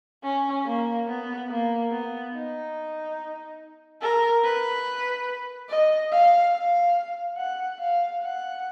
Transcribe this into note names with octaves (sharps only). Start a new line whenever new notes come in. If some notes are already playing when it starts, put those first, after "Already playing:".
C#4
A#3
B3
A#3
B3
D#4
A#4
B4
D#5
F5
F5
F#5
F5
F#5